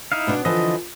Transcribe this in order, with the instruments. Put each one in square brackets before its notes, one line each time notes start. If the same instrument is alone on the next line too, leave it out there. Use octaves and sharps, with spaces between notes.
[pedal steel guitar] D#4 E4 F5
[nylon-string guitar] B2 B3 D4
[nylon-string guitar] D3 E3 F3 [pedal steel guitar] D#5